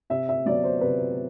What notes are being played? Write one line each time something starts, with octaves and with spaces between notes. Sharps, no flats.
C3 E5
E5
F#3 B3 D5
C5
C3 B4